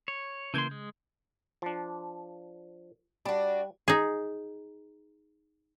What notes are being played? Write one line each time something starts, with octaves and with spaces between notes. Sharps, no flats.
C#5
C#3 E3 A#3 C6 G6 G#6
G#3
F3 D4
G3 D4 F#4
D#4 G#4